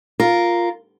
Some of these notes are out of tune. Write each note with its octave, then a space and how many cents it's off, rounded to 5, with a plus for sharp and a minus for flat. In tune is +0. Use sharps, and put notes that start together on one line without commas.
F4 +0 A#4 +0